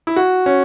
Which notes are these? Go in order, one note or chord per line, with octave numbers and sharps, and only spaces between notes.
E4
F#4
C#4